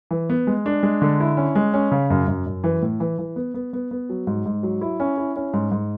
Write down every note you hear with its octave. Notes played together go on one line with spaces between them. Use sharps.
E3
B3
G#3
D4
G#3
D3
E4
C#4
G#3
C#4
C#3
F#2
F#2
F#2
E3
A2
E3
E3
B3
B3
B3
B3
F#3
G#2
G#2
F#3
E4
C#4
E4
C#4
G#2
G#2